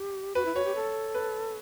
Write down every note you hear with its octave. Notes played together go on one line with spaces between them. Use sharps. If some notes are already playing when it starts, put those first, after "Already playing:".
Already playing: G4
F#4 B4
E4
F#4 C#5
G4
A4
B4